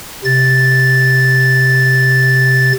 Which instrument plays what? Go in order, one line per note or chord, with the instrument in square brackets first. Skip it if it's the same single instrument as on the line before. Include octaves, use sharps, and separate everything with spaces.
[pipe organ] C3 A6